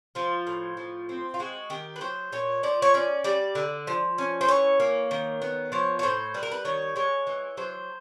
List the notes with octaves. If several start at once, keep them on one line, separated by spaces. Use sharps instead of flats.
F3 F4
A2
F3
C4
F4
G#3 F#4
D#3 G4
B4
F#3 C5
A#2 C#5
F3 D5
C#5
C#4 D5
G3 D5
D3
F3
C#4
C5
E3 C#5
A#3
D#3
B3
F3 C#5
C#5
A2 C5
G3 B4
A#4
B4
D#3 C#5
G#3 C#5
E3
F#3 C5